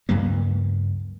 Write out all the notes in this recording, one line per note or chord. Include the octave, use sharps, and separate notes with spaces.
C#2 G2 F#3 A#3